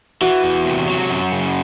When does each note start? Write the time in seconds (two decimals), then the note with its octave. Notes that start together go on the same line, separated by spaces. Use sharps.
0.21 E3 F#4
0.44 E2
0.66 C3
0.88 F#3
1.10 F#2
1.32 C#3